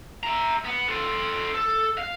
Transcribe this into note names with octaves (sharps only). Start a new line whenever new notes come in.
E5 A#5
B3
A4 C5
A4
F5